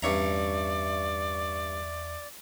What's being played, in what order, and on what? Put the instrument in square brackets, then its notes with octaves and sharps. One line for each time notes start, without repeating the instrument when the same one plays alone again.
[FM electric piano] E2 E5 C#6 [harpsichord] G2 C#4 A#5 [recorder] D5